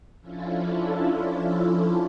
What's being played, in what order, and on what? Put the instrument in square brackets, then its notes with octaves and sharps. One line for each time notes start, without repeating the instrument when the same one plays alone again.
[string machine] F3 C#4 D4 E4 F4 A4